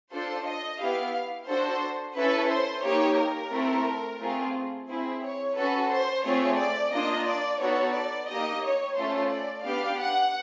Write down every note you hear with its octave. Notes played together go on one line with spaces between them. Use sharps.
D4 F4 A4 C5
D#5
B3 E4 G4 F5
D4 F#4 A4 C5
C#4 E4 A4 B4
C5
A#3 D#4 G4 C#5
A#4
A3 C4 E4 A4
A3 C4 F4 G#4
C4 E4 G#4
C#5
C#4 F#4 A4 B4
C5
A3 C4 F4 G#4 C#5
D5
A#3 D4 F4 D#5
D5
B3 D#4 F#4 A4 C#5
D5
A#3 D#4 G4 D#5
C#5
A3 C#4 F4 A4 C5
D5
B3 D4 G4 F5
F#5